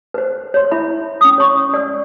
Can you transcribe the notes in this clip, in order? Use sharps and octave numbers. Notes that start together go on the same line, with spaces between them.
B4 C5
C#5 C6
E4 E5 B5
C#4 D#6
C#5 C#6
D5 E6